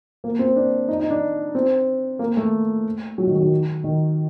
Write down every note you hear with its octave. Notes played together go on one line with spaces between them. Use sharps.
A#3
C4
D4
D#4
D#4
D4
C4
A#3
A3
F#3
D#3
F#3
D#3
D#3